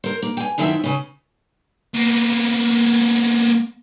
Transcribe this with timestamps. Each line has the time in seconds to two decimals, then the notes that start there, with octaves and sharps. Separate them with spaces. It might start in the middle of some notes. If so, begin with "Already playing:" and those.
0.04 A#4 C5
0.22 A#3
0.37 G5 G#5
0.58 F#2 D#3 C4 E4 G4 E5
0.84 C#3 C#4
1.94 A#3 B3